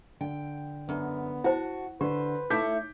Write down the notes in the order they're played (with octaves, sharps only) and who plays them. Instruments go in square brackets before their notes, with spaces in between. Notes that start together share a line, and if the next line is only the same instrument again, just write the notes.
[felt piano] D3 [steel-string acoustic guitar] G5
[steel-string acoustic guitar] F#2 [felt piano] D3 [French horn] B3
[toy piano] E4 C5 [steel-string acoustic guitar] F#4 [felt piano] F#5 A5
[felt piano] D3 [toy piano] G4 [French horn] B4 [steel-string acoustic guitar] C5
[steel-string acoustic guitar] A3 E4 C#5 [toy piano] D#4 [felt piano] D6 G6 B6